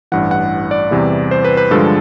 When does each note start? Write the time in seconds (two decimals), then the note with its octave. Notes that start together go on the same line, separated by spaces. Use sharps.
0.12 A1 G2 E3 F#5
0.31 F#5
0.71 D5
0.91 E2 C3 E3 G3
1.31 C5
1.45 B4
1.57 B4
1.71 G2 D3 F3 G#3 A4